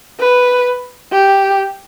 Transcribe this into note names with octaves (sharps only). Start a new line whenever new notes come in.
B4
G4